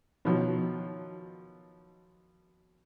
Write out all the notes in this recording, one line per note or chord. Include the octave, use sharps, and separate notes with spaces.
B2 D#3 F3 F#3